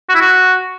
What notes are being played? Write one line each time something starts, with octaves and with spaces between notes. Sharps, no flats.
F#4
E4
F#4